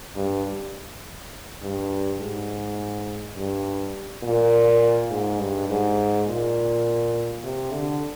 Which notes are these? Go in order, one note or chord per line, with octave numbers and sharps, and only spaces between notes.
G2
G2
G#2
G2
A#2
G#2
G2
G#2
A#2
C3
D3